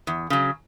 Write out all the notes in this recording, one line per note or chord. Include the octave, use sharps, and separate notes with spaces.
E2
C#3 F#3